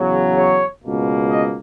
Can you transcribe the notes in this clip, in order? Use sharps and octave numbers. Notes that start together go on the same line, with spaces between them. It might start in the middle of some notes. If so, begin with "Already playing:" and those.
Already playing: E2 C#3 F#3
C#5
C#2 B2 A#3
D#5